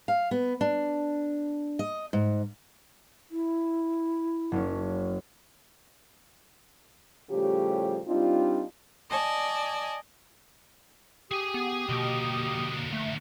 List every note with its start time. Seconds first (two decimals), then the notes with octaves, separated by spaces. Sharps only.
0.08 F5
0.31 B3
0.61 D4
1.79 D#5
2.13 G#2
3.31 E4
4.52 F#1 C#4
7.30 A2 C#3 F3 G3 G4
8.07 G3 C4 D4 D#4 F4
9.11 D5 D#5 G#5 A5
11.32 G4 G#4 G#5 D#6
11.54 B3
11.89 B2 D3 A#3
12.93 A3